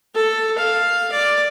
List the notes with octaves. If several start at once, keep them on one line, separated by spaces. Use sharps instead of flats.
A4
F5
D5